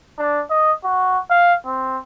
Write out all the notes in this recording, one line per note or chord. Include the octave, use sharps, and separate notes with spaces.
D4
D#5
F#4
F5
C4